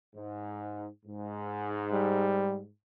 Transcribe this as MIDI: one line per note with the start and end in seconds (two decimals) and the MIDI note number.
0.15 0.87 44
1.05 2.69 44
1.93 2.59 55